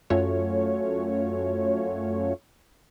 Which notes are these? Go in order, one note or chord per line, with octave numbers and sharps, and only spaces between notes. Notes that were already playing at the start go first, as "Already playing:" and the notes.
F#2 A3 C#4 F4 F#4 C#5